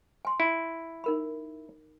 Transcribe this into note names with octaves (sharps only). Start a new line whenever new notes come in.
G#5 C6
E4
D#4 A#4 B5